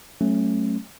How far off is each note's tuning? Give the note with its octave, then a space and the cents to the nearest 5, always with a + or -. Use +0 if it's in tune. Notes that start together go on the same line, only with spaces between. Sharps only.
F#3 +25 A3 +0 C#4 -20